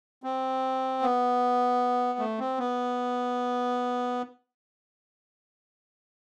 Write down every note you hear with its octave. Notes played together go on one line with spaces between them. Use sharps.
C4
B3
A3
C4
B3